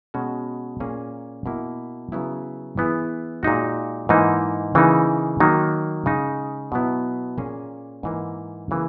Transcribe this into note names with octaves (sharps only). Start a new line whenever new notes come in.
B2 G#3 C#4 F#4
A#2 A#3 C#4 G#4
B2 A#3 E4
C#3 F#3 B3 E4
E3 B3 E4 G#4
A#2 G#3 D#4 F#4
G#2 E3 A#3 D#4
C#3 E3 A#3 D#4
D#3 F#3 A#3 D#4
C#3 G#3 D#4
B2 F#3 B3 E4
A#2 A#3 C#4 G#4
G#2 E3 A#3
C#3 E3 A#3